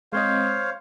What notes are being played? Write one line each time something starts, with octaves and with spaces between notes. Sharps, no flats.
G#3 C4 C5 C#5 D#5 F5